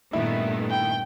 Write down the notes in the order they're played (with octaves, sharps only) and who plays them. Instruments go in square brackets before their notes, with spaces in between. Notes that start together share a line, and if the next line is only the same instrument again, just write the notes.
[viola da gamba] G2 A#2 [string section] D#3 A3 B3 [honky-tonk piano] E4
[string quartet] G5